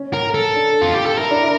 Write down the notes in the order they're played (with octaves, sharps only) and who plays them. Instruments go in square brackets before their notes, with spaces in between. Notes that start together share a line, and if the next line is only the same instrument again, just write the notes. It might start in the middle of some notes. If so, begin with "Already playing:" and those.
Already playing: [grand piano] C#4
[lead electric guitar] A#4
A4
[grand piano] D4
[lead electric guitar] F4
G4
A4
[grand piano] E4 [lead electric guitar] A#4
[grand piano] D4
E4